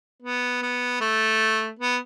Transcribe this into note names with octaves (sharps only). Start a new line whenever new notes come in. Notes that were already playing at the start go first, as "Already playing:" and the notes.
B3
B3
A3
B3